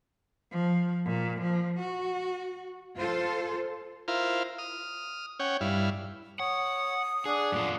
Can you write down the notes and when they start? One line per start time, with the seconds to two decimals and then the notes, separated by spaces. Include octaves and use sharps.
0.52 F3
1.05 A#2
1.42 F3
1.79 F#4
2.97 F4 A4 C5
4.08 E4 F4 A#4 C5 F5
4.58 D#6 F6
5.40 C#4 C#5 F#5 G5
5.61 G2 E4 F5
6.40 C#5 F#5 D#6
7.26 D4 G#4 F#5
7.52 F#2 A#2 F4